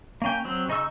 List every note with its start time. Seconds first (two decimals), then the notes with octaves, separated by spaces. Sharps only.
0.22 A#3 C#4 G5
0.45 F#3 C4
0.69 C#3 D#4 D#5 C#6 E6